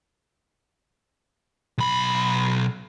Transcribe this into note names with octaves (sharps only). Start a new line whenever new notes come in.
B1 B5